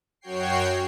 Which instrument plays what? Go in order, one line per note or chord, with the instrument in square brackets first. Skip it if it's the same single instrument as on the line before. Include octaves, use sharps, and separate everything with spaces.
[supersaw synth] F#2 F#4 C#5 G5 C7